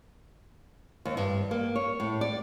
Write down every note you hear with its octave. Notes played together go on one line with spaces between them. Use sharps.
D#2
G2
A#3
C#5
A2
D5